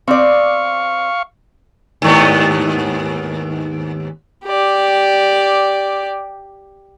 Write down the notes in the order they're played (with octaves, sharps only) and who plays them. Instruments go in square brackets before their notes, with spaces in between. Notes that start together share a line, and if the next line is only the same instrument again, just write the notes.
[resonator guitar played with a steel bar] C4 D5 [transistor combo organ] F5 C#6
[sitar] D#2 G#2 B3
[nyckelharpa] G4 D5